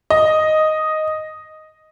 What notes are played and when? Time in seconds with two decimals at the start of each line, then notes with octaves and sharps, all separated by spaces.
0.10 D#5